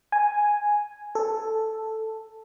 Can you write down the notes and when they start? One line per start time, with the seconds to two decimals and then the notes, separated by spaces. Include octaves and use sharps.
0.12 G#5
1.15 A4